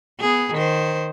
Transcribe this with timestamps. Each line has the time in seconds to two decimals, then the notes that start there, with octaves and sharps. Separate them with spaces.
0.20 B3 G#4
0.54 D#3 C5